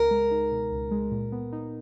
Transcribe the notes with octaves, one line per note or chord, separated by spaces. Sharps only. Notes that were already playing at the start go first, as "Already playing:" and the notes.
Already playing: C#2 A#4
G#3
D#4
B2
C#2
G#3
A#2
B3
D#4